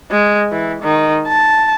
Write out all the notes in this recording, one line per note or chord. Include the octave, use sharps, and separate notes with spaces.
G#3
E3
D#3
A5